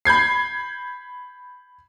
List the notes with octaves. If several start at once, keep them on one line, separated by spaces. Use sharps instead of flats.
B5 G6 G#6 C7